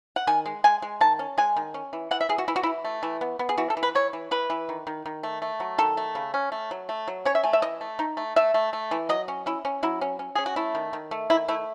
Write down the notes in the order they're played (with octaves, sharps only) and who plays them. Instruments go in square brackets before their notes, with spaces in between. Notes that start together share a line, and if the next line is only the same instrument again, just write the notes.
[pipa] F#5
D#3 G#5
G#3
G#3 G#5
G#3
D#3 A5
C#4
G#3 G#5
D#3
C#4
E3
E3 F#5
E5
E3 G#4
F#4
E3 E4
F#4
E4
E3
A3
E3
B3
B3
G#4
E3 F#4
A4
E3
B4
E3 C#5
E3
E3 B4
E3
D#3
D#3
D#3
A3
A3
F#3
D#3 A4
A3
C#3
C#4
A3
F#3
A3
F#3
C#4 C#5
E5
A3 G#5
E5
E3 D#5
A3
D#4
A3
A3 E5
A3
A3
E3
F#3 D#5
C#4
C#4 E4
C#4
F#3 E4
C#4
C#4
C#4 G#4
F#4
A3 E4
D#3
D#3
A3
D#3 E4
A3 E4